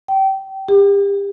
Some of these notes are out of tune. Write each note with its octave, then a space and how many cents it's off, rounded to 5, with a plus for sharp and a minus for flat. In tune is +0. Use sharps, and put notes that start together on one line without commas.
G5 -25
G4 +30